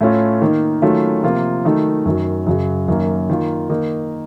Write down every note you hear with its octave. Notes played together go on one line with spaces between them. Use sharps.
A2 A3 C#4 F4
D#3 A#3 D#4
D#3 F#3 A3 C#4 F4
C3 F3 A#3 F4
D#3 F#3 A3 D#4
F#2 D#3 F#3
F#2 C#3 F#3
F#2 D#3 A#3
D#3 A#3 F4
D#3 A#3 D#4